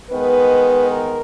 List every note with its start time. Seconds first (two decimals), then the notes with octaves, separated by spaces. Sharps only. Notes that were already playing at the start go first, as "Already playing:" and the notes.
0.10 D#3 G#3 B3 B4
0.91 A#4